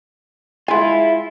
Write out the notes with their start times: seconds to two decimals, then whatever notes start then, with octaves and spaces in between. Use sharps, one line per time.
0.68 G#3 E4 F4 G#5